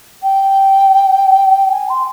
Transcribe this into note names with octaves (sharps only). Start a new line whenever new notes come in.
G5
G#5
C6